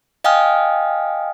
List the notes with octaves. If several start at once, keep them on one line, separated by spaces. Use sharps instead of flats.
D#5 F5 G5 G#5 D#6 F6